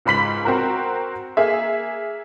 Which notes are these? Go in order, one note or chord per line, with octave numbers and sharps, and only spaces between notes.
C#2 G#2 B5 B6 F#7
C4 F#4 A#4
A#3 G#4 E5